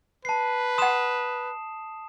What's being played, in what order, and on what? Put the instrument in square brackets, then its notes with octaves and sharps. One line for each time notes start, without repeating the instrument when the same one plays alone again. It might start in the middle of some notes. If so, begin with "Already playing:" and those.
[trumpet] B4 [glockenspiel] A5 C7
[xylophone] F#5 C6 [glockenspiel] D#6 E7